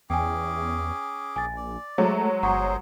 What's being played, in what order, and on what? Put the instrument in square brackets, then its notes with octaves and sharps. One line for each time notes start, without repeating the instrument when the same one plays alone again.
[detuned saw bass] E2 [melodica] C#4 G#4 D6 [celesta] G5 G#5
[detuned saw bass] A#1 [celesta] G#5 A6
[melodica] D5
[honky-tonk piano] F#3 G#3 [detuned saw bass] A3 [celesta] C5 C#5 A#5
[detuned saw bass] G1 [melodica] G#4 C5 [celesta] F#5 A#5 C#6